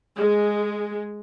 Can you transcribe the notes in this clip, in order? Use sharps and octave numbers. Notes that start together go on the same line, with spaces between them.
G#3